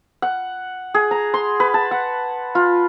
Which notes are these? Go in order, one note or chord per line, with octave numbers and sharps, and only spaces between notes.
F#5
G#4
A#5
C6
B4
A5
F#5
F4